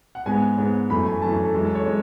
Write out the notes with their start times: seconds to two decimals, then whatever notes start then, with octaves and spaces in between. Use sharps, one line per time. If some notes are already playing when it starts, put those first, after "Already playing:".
0.15 F#5
0.26 G#2 G#3 B3 G#5
0.58 G#2 G#3 B3
0.90 F#2 E3 A3 B5
1.06 G#5
1.22 F#2 E3 A3 A5
1.43 A4
1.54 F#2 E3 G#3
1.65 A4
1.75 C#5
1.86 G#3